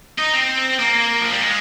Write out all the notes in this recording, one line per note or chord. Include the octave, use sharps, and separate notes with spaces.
D#4
C4
A#3
F3
G3
G#3